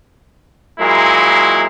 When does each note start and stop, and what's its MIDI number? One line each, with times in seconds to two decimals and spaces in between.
0.80 1.66 46
0.80 1.66 54
0.80 1.66 56
0.80 1.66 58
0.80 1.66 64